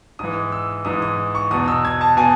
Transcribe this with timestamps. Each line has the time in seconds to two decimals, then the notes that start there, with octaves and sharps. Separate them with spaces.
0.19 G#2 E3 D#6
0.52 E6
0.85 G#2 E3 D#6
1.02 D#6
1.35 C#6
1.51 E2 B2 D#6
1.68 E6
1.85 G#6
2.01 A5
2.17 B2 G#5